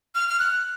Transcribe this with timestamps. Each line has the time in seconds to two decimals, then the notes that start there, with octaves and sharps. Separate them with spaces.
0.15 F6
0.29 F6
0.39 F#6